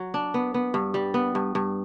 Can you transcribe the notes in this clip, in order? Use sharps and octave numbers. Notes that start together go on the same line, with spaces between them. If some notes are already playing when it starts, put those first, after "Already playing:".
Already playing: F#3
D4
B3
B3
G2
G3
B3
G2
G2